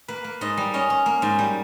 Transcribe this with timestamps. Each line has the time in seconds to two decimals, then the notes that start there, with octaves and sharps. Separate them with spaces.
0.08 A#3 B4
0.24 A#3
0.41 G#2 D#5
0.57 G3
0.74 C#4 D#5
0.90 C#4
1.06 A#3
1.22 G#2
1.39 G3